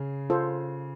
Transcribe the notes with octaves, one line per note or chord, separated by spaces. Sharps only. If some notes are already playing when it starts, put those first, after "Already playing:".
Already playing: C#3
F4 A4 C5